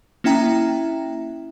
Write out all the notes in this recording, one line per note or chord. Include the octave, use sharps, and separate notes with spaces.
A#3 C#4 E4 E5 G5 A#5